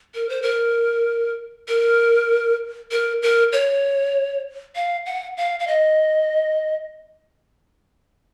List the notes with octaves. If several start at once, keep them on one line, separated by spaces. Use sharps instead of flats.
A#4
C5
A#4
A#4
A#4
A#4
C#5
F5
F#5
F5
F5
D#5